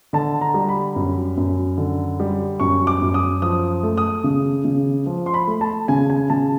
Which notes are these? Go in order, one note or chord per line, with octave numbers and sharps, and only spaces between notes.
D3 A5
A#5
G3
B5
F#2
F#2
D3
G3
F#2 C#6
D6
F#2
D#6
F3 D#6
A3
D#6
C#3
C#3
F3
C6
B5
A3
A5
C#3 G#5
G#5
C#3 A5